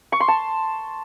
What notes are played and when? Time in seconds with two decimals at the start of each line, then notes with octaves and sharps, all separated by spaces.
0.12 C#6
0.20 C6
0.28 A5